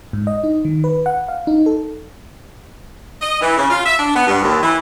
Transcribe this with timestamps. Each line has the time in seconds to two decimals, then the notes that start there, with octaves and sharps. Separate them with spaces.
0.13 G#2
0.27 D#5
0.44 D#4
0.65 D#3
0.84 B4
1.06 F#5
1.28 F5
1.47 D#4
1.66 A4
3.22 D#5
3.41 E3
3.57 C#3
3.69 F4
3.86 E5
3.98 D4
4.15 B3
4.27 G2
4.43 D#2
4.62 E3